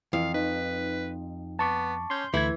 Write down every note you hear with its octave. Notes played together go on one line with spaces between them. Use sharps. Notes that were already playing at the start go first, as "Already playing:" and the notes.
F2 E3 F5
D#4 B4
B3 A5 C#6 D6
C#4 C6 G6
D2 E3 A3 E4 G#6